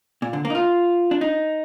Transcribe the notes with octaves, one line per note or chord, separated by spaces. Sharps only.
A#2
D3
A#3
D#4
F4
D4
D#4